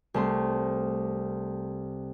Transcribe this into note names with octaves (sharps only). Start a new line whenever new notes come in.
C2 A3 C6